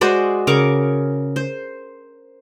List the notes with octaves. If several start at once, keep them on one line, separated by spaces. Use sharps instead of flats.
G#3 F#4 C5 D5
C#3 A#4 C#6 D6
C5